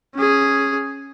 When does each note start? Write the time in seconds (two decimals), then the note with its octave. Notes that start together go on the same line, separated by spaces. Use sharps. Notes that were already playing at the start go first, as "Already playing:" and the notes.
0.15 C#4 G#4